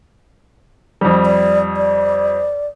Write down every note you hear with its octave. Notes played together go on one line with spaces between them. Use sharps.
F2 G3
D5
D5